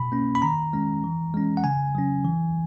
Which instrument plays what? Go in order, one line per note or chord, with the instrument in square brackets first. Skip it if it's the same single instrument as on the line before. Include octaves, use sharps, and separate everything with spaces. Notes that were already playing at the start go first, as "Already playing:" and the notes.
Already playing: [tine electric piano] B2 B5
A#3 C#4
B5
D#3 A#5
G#3 C#4
E3
G#3 C#4
F#5
C#3 G#5
F#3 C#4
E3